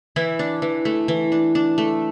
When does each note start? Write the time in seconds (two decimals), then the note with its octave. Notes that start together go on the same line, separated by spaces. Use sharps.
0.16 E3 E4
0.39 D4
0.62 E3
0.85 A3
1.08 E3
1.32 D4
1.55 D4
1.78 A3